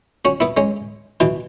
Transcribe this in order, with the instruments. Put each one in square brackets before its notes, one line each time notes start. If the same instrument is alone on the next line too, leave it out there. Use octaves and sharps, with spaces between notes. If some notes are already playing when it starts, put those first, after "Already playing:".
[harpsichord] C#4 F#4
B3 E4
G#3 C#4
B2 E3